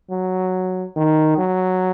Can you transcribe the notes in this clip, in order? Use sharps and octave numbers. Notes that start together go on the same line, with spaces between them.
F#3
D#3
F#3